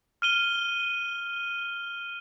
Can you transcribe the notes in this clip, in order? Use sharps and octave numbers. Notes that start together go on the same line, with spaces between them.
F6 D#7 G7